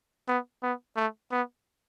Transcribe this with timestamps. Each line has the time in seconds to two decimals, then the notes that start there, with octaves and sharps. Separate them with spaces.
0.28 B3
0.63 B3
0.96 A3
1.31 B3